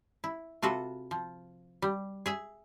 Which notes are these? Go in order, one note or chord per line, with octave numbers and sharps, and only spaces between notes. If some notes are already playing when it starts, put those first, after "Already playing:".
E4
C3 F4 F#4 A4 B4
F3
G3
G#4 E5 G#5